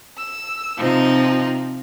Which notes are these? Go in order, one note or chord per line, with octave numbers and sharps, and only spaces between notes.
E6
C3 F3 C4 D#4